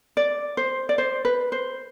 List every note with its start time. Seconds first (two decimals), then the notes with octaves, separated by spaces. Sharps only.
0.17 D5
0.57 C5
0.89 D5
0.98 C5
1.25 B4
1.52 C5